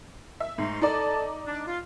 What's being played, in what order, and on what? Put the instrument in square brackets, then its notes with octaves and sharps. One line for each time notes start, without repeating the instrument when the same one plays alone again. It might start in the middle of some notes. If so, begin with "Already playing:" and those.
[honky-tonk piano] E5
[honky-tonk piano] G#2 [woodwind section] A3 A#5 C6
[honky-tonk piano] D#4 D5 [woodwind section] A4 A5
[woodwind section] D4
F4